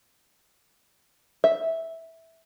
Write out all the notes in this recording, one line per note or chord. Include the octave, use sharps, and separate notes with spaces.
E5